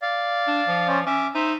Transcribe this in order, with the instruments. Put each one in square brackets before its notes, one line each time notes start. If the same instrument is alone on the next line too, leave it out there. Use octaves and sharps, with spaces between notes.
[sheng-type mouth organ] D5 F5
[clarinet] D4
F3
[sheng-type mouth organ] C#4 C5 D5
[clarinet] C#4 [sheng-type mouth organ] E5 D6
[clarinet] D#4 [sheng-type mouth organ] C5 E5